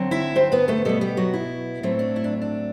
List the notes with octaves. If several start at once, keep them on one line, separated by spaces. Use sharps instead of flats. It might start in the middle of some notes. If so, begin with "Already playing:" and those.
Already playing: D3 F#3 C4
E4 E5
C4 C5
B3 B4
A3 A4
B2 G3 A3 B3 A4
G3 G4
F#3 F#4
E4
A2 F#3 A3 C4
D4
E4
D4
D4